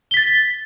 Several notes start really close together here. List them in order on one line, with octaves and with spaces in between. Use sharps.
G7 B6 A6